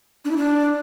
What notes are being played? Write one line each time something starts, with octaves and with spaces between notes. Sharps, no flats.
D4
E4
D4